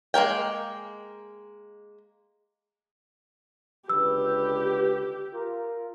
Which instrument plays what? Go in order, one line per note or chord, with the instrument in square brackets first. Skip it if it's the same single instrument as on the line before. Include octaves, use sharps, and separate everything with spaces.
[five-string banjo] G#3 A#3 A#4 G5
[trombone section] C#2 D3 B4 [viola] G4 [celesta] E6
[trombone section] F4 A#4